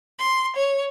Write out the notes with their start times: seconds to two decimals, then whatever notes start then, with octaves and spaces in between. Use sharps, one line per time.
0.18 C6
0.57 C#5